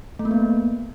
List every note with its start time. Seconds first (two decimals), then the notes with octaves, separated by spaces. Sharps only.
0.19 A3
0.25 A#3
0.31 B3